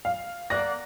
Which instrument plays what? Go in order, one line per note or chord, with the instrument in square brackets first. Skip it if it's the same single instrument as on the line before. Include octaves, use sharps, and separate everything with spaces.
[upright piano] F5
[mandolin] A#3 D5 F#5 [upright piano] A#6